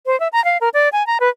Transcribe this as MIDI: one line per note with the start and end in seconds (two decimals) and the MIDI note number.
0.06 0.18 72
0.20 0.28 76
0.33 0.43 82
0.45 0.58 77
0.61 0.69 70
0.74 0.89 74
0.92 1.05 80
1.07 1.18 82
1.20 1.29 71